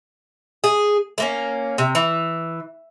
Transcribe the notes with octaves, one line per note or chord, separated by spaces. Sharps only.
G#4
A3 A#3 C#4
C3
E3